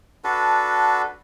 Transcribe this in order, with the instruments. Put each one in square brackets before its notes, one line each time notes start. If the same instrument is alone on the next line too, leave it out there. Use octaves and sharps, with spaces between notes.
[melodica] D4 F#4 A4 B4